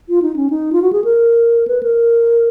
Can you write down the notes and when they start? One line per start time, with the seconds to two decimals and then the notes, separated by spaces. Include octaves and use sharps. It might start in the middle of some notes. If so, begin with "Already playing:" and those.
0.09 F4
0.22 D#4
0.36 C#4
0.50 D#4
0.73 F4
0.82 F#4
0.93 G#4
1.04 A#4
1.68 B4
1.83 A#4